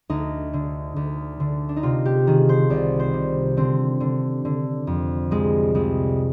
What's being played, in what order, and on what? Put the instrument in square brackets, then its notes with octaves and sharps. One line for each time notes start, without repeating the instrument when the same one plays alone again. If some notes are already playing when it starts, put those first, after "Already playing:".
[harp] D2 D#4
D3
D2
D3
D4
D#4
C3 F4
G4
D#3 G#4
C5
C2 D5
C5
C3
D3 C4
D3
D3
F2
C2 G#3
C2 G#3